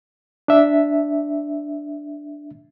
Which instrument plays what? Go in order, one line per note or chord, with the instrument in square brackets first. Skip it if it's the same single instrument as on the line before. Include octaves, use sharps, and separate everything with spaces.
[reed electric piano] D4 E5